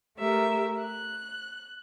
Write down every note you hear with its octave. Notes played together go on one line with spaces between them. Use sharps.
A3 G4 A#4 E5
F#6